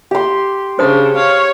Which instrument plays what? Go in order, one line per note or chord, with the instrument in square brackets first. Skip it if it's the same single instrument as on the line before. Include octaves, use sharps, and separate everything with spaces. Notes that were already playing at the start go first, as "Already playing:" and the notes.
[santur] G4 C6
[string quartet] C#3 [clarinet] D4 [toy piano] C5 D#6
[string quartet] C#5 [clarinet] F5